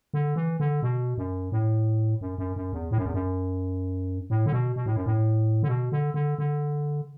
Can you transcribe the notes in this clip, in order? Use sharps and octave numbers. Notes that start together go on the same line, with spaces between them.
D3
E3
D3
B2
F#2
A2
F#2
F#2
F#2
E2
A2
F#2
E2
F#2
A2
D3
B2
B2
A2
F#2
A2
D3
B2
D3
D3
D3